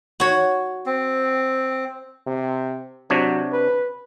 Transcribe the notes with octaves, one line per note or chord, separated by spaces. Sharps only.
F#4 C#5
C4
C3
C3 F#3 D4 C#5
B4